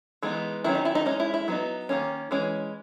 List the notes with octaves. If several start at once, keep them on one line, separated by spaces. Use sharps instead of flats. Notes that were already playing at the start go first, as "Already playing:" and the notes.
E3 G#3 B3 D#4
D#3 F#3 C#4 E4
D#4
E4
D#4
G#3 C#4 D#4
E4
E4
F#3 B3 D#4
D#3 A#3 C#4
E3 G#3 C#4